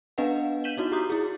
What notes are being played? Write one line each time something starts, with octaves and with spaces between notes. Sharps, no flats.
B3 D4 B4 D#5 F5 F#5
G6 B6 D#7 E7 F#7 G7
D#4 E4 F#4
F#4 G4 A#5 D6 D#6 G6
E4 G#4